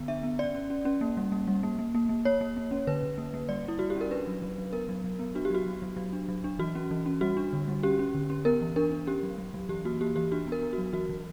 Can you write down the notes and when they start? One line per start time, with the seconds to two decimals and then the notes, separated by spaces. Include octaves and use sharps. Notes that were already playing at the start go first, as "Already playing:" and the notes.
Already playing: D3 B3
0.08 D4 E5
0.23 B3
0.39 C#4 D5
0.55 C#4
0.70 C#4
0.85 C#4
1.01 A#3
1.17 G3
1.32 A#3
1.47 G3
1.63 A#3
1.79 A#3
1.94 A#3
2.09 A#3
2.25 A#3 C#5
2.41 A#3
2.57 A#3
2.71 C#4
2.87 D3 B4
3.03 D3
3.18 A#3
3.34 A#3
3.49 G3 D5
3.65 G3 E4
3.79 G3 F#4
3.90 G4
3.95 C#4
4.01 A#4
4.11 D4 B4
4.27 F#3
4.42 F#3
4.58 F#3
4.73 B3 A#4
4.89 F#3
5.04 F#3
5.19 B3
5.35 D4 F#4
5.45 G4
5.50 F#3 F#4
5.66 F#3
5.82 F#3
5.97 F#3
6.13 D4
6.28 F#3
6.44 D4
6.59 E3 F#4
6.75 C#4
6.91 E3
7.06 C#4
7.21 G3 F#4
7.37 D4
7.53 D3
7.68 G3
7.83 C#4 G4
7.99 C#4
8.14 D3
8.30 C#4
8.45 B3 A#4
8.61 E3
8.76 D4 A#4
8.92 D4
9.07 C#4 G4
9.23 F#3
9.38 F#3
9.54 F#3
9.69 E3 G4
9.85 A#3 F#4
10.00 A#3 G4
10.16 E3 G4
10.32 D4 F#4
10.47 B3
10.52 A#4
10.62 B3
10.73 F#4
10.78 F#3
10.93 E3 F#4
11.09 E3